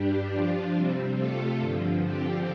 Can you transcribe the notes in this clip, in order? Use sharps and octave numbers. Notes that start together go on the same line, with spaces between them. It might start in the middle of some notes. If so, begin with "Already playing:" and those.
Already playing: G2 G3 D4 G4
F3 D4 F4
C3 G3 C4
C3 A3 F4 A4
G2 D3 F3
D3 F3 C4 G4